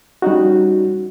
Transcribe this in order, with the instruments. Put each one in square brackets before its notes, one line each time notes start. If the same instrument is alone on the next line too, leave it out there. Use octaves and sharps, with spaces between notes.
[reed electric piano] G3 C#4 D#4 F#4